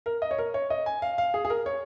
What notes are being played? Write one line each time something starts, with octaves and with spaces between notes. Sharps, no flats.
A#4
D#5
C#5
A#4
C#5
D#5
G#5
F5
F5
G#4
G#4
A#4
C#5